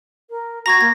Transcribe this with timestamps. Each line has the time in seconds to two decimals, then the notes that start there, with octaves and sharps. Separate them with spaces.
0.30 A#4
0.66 F#4 A#5 C#6 G#6 A#6
0.81 A#3 G#6